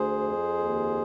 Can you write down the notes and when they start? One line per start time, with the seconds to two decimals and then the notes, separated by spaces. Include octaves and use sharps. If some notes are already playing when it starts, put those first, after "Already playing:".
Already playing: D2 G#4 C5
0.18 F2
0.57 D#2